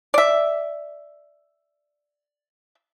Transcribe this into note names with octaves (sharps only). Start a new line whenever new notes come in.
D5 E5